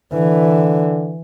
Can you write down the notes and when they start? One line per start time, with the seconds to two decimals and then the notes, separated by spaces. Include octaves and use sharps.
0.13 D3 E3